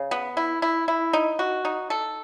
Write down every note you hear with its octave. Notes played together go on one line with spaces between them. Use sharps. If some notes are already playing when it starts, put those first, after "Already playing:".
Already playing: C#3
B3
E4
E4
E4
D#4
F#4
D#4
A4